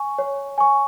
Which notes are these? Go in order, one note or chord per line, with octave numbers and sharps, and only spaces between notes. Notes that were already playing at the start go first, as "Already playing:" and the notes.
Already playing: G#5 C#6
C#5
G#5 C#6